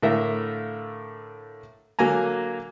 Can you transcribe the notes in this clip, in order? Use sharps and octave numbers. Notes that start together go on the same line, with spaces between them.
A2 D3 A3 A#4 E5 F5
D3 F#3 A#3 G#5 A#5